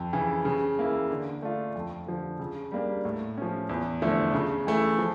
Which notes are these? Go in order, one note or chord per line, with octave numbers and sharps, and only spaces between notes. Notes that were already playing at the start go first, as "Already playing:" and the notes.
Already playing: F2
C#3 E3
C#3
E3 A#3 E4
D3
A3 D4 F4
F2
D3 F3
C#3
G3 A#3 D4 G4
A2
F3 C#4
E2
D3 F3 A3 E4
C#3
E3 A3 E4
F3